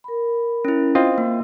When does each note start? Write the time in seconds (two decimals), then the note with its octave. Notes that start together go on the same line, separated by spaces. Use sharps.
0.04 A#4 B5
0.65 C#4 E4
0.95 C4 F4 D#5
1.18 A#3